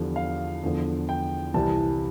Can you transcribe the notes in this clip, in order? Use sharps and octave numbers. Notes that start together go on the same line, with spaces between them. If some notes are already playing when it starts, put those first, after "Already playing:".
Already playing: E2 D3 F3 G4
F5
E2 D3 F3
G5
C2 C3 E3 G3 A5